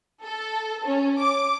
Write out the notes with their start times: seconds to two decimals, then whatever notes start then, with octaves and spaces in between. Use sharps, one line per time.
0.24 A4
0.86 C#4
1.18 D6